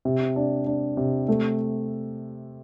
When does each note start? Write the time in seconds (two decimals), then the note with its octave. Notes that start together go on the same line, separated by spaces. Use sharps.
0.05 C3
0.36 D4
0.66 D4
0.97 C3
1.28 A3